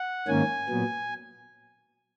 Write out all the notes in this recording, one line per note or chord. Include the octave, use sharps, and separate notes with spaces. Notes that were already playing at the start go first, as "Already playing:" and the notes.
Already playing: F#5
G#2 D#3 A#3 C#4 G#5
A#2 F#3 B3